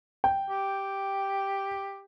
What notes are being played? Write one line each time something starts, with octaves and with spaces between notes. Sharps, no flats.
G5
G4